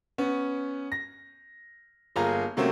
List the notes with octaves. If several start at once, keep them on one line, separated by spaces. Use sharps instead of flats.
B3 C#4
A#6
G1 A#3 F4 G#4 A#5
C3 F#3 A3 A#3 C4 C#4